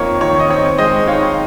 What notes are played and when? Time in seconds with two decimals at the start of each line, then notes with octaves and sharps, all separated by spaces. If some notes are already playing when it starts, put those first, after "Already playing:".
Already playing: F2 D#3 A#3 D#4 C#5
0.21 D#3 C#5
0.39 D#5
0.50 C4 C#5
0.78 G#3 C5 D#5
1.07 D#4 C#5 F5